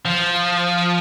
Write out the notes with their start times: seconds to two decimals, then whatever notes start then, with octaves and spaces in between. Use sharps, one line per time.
0.05 F3